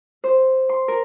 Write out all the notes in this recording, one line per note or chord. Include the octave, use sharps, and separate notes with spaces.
C5
C6
A#4